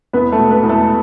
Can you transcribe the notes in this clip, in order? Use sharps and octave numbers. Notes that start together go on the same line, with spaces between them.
E2 B3 B4
A3 A4
B2
B3 B4
E2
A3 A4